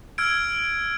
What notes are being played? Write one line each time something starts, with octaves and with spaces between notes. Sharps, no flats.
E6 F6 G#6 D7